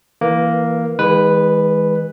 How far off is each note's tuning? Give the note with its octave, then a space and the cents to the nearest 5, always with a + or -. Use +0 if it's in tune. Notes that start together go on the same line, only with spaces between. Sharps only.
E3 +0 A#3 +0 B4 -20
D#3 +45 G#3 -30 B4 +0